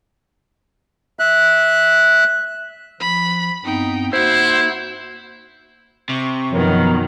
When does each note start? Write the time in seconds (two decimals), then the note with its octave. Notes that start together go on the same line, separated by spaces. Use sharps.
1.19 E5 F#6
3.01 F3 B5
3.64 G2 B3 C4 D#4 G5
4.13 A#3 D#4 E4 F#4 C5 F#5
6.09 C3 C#6
6.52 F#2 B2 D#3 F3 B3 A#4 C#5